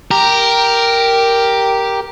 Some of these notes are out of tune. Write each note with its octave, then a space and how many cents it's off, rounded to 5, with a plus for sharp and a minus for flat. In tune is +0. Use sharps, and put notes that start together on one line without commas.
G4 +0 A#4 +0